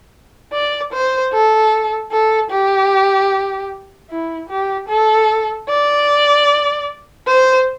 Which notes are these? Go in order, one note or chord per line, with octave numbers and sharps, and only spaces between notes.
D5
C5
A4
A4
G4
E4
G4
A4
D5
C5